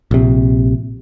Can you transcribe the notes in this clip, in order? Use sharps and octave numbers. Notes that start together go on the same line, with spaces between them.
A#1 C3